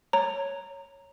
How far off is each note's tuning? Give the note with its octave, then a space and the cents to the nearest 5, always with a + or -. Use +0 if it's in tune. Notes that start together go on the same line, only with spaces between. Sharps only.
C#5 +0 A#5 -5